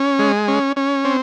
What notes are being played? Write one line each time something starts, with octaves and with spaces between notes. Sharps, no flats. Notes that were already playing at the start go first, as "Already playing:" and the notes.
Already playing: C#4
G#3
C#4
C#4
C4